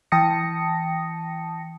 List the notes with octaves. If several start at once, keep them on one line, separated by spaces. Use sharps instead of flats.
E3 G5 A5 D#6 A#6 C#7